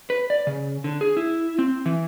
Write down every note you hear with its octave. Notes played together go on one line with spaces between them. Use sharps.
B4
D5
C#3
D3
G#4
E4
C4
E3